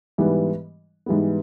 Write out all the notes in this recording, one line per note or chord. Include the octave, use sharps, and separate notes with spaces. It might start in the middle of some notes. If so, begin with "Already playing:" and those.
G#2 E3 G3 B3
G#2 E3 G3 B3